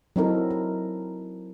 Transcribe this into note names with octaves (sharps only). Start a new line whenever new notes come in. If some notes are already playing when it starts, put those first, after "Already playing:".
F#3 C4 D#4 E4 A4 A#4
A#4